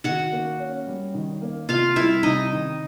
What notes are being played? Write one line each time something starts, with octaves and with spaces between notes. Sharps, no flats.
D#3 F#4 F#5
A#3
C#4
G3
D#3
A#3
C3 F4 F5
G3 E4 E5
C3 D#4 D#5
D#3